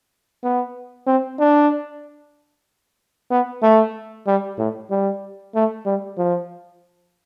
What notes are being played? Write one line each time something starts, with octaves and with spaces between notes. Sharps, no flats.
B3
C4
D4
B3
A3
G3
A2
G3
A3
G3
F3